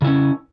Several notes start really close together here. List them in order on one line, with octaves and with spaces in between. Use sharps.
C#3 E4 C#4